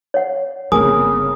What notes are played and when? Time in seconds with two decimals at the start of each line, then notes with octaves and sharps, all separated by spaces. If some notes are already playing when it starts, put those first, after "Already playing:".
0.14 C#5 F#5
0.72 G1 C#3 A#3 C4 G#4 A#4 G#5 D#6